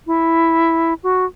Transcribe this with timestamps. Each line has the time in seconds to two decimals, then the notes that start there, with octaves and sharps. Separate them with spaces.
0.07 E4
1.03 F#4